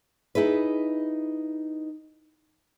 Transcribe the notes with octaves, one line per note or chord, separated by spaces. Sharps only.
D#4 E4 G#4 B4